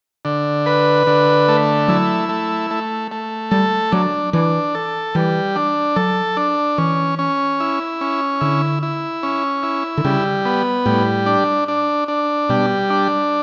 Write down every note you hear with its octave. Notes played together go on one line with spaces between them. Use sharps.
D3
B4
D3
A3
F#3 E4
A3
A3
A3
G3 A4
F#3 D4
E3 D4
A4
E3 G3
D4
F#3 A4
D4
E3 C#4
C#4
E4
C#4
D3 E4
E4
C#4
E4
D3
C#3 G3
B3
A2 G3
D4
D4
D4
B2 G3
D4